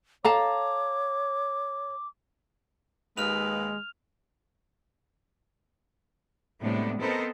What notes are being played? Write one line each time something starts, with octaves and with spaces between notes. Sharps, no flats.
A4 C#5 F5 A5 A#5 D6
D#2 G#3 B4 F6 F7
A2 C3 G3 G#3 B3 D4
B3 C4 A4 A#4 C5 D#5